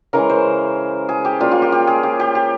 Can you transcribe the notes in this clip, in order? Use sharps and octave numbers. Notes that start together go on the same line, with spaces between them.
C#3 E3 G#3 C#4 A#4
C5
G#4
G4
C#3 G3 A#3 F4
F4
G4
G4
G#4
G4
G4
G4